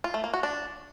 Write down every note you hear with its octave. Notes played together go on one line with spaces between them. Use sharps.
F4
A3
A#3
F#4
D4